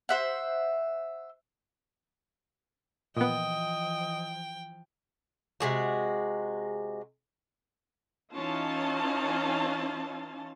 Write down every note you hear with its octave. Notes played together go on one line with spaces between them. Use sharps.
C5 E5 F#5
A#2 E3 F3 B3 D#5 G5
C3 G#3 F#4
E3 C#4 D#4 F4 A5